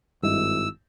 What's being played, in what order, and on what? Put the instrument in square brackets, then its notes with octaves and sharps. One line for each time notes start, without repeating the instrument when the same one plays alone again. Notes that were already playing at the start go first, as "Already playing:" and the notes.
[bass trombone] G#1 [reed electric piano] G2 D#4 E4 [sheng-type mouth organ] E6